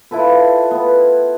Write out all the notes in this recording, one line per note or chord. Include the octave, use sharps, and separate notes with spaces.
E4 F4 A4 B4
B3